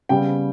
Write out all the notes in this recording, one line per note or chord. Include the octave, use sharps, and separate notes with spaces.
C#3 G3 B3 G5